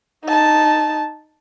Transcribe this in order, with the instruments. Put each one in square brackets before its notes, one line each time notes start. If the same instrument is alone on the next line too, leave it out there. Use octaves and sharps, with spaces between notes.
[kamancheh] D#4 A5